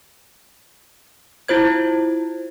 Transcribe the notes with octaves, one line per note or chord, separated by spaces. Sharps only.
E4 F4 C5 G#6